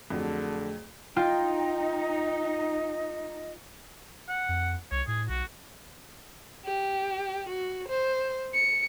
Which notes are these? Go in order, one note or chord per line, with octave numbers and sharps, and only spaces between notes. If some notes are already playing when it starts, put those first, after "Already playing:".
F2 D3 F#3 A3 G#4
D#4 F4 D#5 G5
F#5
F2
C2 C#5
A2 G#4
B1 F#4
G4
F#4
C5
C#7